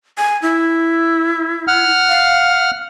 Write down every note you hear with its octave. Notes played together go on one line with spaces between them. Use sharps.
G#5
E4
F#5 F6
F5